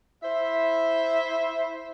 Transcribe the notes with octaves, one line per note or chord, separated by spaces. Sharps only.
E4 C5 E5